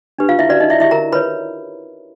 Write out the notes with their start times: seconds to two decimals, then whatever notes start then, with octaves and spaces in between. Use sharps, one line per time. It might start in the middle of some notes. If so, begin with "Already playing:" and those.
0.19 D4 G4 B4
0.29 F4 F5
0.39 E4 E5
0.49 C#4 F#4 B4 D5
0.60 D#4 D#5
0.70 E4 E5
0.80 E4 G4 C5 E5
0.91 A#4 A#5
1.12 F4 A#4 B4 C#5 B5